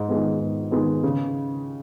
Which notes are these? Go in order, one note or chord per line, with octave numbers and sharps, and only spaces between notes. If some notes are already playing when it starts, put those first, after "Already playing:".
Already playing: G#2
D#3 G#3 B3
G#2
D#3 G#3 B3
C#3